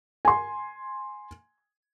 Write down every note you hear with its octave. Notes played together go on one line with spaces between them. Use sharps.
G#5 C6